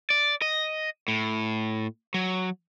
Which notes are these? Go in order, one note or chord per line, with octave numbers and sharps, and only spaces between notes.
D5
D#5
A2
F#3